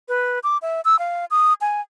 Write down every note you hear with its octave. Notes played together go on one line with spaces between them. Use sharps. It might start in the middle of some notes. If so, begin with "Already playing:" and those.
B4
D6
E5
E6
F5
D#6
G#5